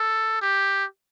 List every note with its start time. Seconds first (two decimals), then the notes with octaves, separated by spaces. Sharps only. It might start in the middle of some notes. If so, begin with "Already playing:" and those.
Already playing: A4
0.42 G4